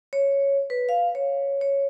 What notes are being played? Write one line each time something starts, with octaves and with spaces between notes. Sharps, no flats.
C#5
B4
F5
C#5
C#5